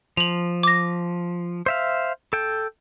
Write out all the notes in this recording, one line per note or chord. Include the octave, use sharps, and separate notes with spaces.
F3 F7 F#7
D6 A#6
C5 E5 F5
A4 G5